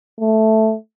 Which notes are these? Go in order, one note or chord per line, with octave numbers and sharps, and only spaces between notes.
A3